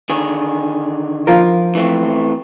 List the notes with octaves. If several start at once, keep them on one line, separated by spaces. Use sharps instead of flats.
D3 D#3 G#4
F3 F4 A#4
E3 A3 C4